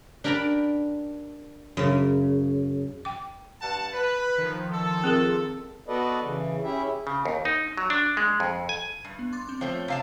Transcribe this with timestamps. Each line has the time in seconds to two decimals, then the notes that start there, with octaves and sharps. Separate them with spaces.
0.24 D4 G4 A#4 D5 A#5 B5
1.77 F#2 C#3
3.05 G5 D6
3.61 G2 F#5 A5
3.93 B4
4.38 D#3 F3
4.71 A4
5.04 C4 G#4 A#4
5.88 B3 F#4 A4 B4 D5 D#5
6.23 C#3 E3
6.64 C#4 E4 G4 G#4 E5
7.07 C#3
7.25 D#2
7.45 D#4
7.77 F#3
7.90 D4
8.17 G#3
8.40 F2
8.69 G#5
9.04 G2
9.19 B3
9.32 C6 D6 A6
9.47 C4 D6
9.61 F3 A3 C5 C#5 G5
9.88 C3 F5 A5